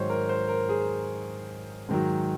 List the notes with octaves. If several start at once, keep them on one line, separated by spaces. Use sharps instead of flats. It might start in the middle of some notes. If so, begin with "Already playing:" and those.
Already playing: G#2 D#3 F#3 C5 C#5 D#5
A#4
C5
A#4
G#4
G#2 D#3 F#3